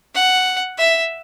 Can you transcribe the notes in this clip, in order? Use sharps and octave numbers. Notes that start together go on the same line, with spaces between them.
F#5
E5